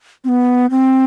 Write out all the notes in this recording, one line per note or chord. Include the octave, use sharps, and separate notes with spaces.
C4
B3
C4